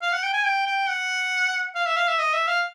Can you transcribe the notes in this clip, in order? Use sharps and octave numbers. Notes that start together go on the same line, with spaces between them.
F5
F#5
G5
G#5
G5
G5
F#5
F5
E5
F5
E5
D#5
E5
F5